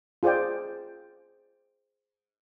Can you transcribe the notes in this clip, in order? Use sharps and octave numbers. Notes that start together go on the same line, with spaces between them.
F4 G#4 C5 D5 G5